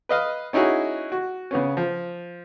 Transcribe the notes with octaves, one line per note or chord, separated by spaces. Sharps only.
B4 D#5 F5
C#4 D#4 E4 F#4 G#4
F#4
C#3 B3 C#4
F3